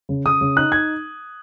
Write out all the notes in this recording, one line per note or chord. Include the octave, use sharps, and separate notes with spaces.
C#3
C#3 D#6
C#3
D#4 F#6
D#4 G#6